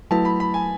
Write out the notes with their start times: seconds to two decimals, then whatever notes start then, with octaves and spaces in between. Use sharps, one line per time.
0.11 F#3 A3 E4 B4 A5
0.25 B5
0.40 B5
0.54 G#5